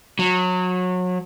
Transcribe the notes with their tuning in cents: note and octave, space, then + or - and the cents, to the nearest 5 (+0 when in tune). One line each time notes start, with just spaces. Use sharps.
F#3 -25